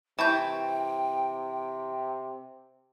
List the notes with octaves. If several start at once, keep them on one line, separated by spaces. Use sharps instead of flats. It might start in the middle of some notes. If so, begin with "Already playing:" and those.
C3 E3 G5 A5 C#6 G6